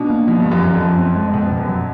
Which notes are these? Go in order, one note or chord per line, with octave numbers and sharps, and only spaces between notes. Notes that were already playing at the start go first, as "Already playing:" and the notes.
Already playing: B2 D4
A#3
B2 F3
G2
F3
F#2
F#2 F3
F2
F#2 F3
C4
G#3
F2 B2
F2
B2
F#2
F#3